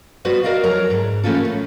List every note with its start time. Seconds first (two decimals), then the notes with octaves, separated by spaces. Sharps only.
0.25 G3 B3 F#4 B4 C5
0.43 F#4 A#4 D5 D#5 F5
0.63 F2 F#3 A#4 C#5 A5 A#5
0.90 G#2
1.23 E3 A3 A#3 C#4 F4 A4
1.45 A2